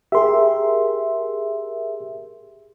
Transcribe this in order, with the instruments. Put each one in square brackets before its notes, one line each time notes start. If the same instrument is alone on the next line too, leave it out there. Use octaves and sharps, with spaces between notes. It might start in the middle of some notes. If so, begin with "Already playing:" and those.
[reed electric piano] G4 C6 [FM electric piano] G#4 A#4 E5